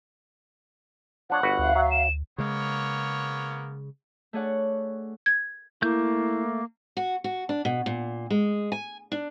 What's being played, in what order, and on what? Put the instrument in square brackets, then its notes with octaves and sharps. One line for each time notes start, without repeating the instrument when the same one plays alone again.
[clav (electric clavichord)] F3 D4 C#5 [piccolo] F#5
[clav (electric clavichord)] G1 F#4 B4
[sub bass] D2 [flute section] E5 F5
[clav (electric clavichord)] F#3
[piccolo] E7
[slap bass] C#3 G#3 [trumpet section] A#3 B3 C#5
[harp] A3 D4 G#4 C#5 D5 F#5
[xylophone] G#6
[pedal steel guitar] A3 G6 [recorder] A#3 [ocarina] E4
[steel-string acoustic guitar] F#4
F#4
D4
B2
A#2
G#3
G#5
D4